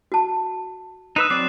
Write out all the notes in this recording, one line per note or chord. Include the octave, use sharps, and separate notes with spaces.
F#4 A5
D#4 B4 D#6 E6 F#6 E7
F#3 C4 D5 D6 C7 E7